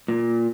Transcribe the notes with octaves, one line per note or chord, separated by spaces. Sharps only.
A#2